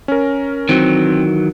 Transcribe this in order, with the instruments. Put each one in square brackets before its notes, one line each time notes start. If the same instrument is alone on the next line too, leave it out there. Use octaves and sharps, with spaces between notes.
[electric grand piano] C#4 A#4
[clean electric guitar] D#3 E3 F#3 [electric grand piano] C4